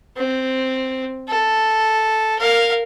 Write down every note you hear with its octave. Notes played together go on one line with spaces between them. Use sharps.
C4
A4
A#4 F5